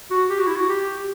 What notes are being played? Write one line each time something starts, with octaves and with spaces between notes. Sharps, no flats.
F#4
G4
F#4
E4
F#4
G4